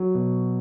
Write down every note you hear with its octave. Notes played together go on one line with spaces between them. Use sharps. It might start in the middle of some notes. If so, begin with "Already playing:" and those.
Already playing: F#3
B2